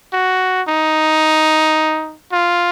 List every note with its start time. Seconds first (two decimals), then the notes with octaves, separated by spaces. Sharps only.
0.13 F#4
0.68 D#4
2.32 F4